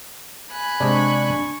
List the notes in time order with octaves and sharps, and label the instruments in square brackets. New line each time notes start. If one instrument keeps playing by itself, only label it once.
[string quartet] G#5 B5 F#6
[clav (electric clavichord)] C3 G#3 C4 [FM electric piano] D4 [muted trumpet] C#6